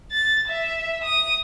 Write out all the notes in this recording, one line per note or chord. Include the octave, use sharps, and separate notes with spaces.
A6
E5
D#6